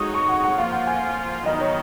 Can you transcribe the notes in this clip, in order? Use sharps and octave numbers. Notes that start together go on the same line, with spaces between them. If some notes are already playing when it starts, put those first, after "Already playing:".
Already playing: G#3 D#4 F#4 C#5 D#6
C#6
F#5
F#5
F3 A#3 F4 F5
F#5
G#5
D#3 F#3 B3 D#4 D#5
D#5
C#5